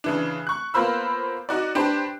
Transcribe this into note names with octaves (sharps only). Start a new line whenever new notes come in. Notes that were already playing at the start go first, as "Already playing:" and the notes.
C#3 E3 D4
C#6 F#6
A#3 B3 F4 C5 B5 E6
D#4 F#4 D5
D4 G4 B4 C5